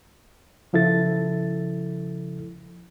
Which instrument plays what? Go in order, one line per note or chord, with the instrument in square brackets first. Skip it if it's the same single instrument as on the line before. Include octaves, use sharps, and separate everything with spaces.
[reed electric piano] C#3 F3 E4 A4 A6